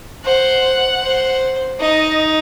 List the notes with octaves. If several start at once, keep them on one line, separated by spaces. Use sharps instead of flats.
C5 F#5
C5
D#4 D#5